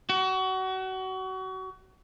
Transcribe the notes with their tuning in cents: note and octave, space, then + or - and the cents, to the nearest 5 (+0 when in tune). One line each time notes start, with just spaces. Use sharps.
F#4 +30